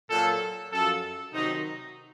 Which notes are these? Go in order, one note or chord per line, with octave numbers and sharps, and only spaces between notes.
A#2 F#3 A4
F#2 F3 A4
C3 D#3 F#3 D#4